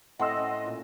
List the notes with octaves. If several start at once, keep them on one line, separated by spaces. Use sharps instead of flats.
A2 C4 D#5 F#5 C6 E6
C#4
A#2